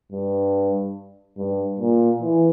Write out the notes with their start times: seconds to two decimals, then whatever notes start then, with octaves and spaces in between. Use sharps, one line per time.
0.12 G2
1.37 G2
1.80 A#2
2.22 E3